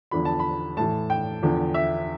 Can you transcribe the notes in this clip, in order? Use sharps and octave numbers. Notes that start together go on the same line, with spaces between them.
E2 D3 F3 B5
A5
B5
A2 E3 A5
G5
E2 D3 F3
E5